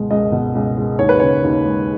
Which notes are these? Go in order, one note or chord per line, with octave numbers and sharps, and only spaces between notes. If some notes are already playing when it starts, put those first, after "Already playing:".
Already playing: C#2 B2 G#3
C#2 D#5
B2
C#2
G#3
D#2 C#5
B4
C#3 C#5
D#2
G#3